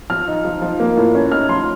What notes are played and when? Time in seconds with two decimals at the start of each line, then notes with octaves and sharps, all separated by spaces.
0.10 F3 F6
0.27 D#4
0.45 F3
0.62 F3
0.80 A#3
0.97 A2
1.14 C#4
1.32 D#4 F6
1.49 F3 C6